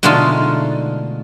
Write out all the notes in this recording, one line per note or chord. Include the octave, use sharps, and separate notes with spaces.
B2 D3 G#3 A3 D#4 F4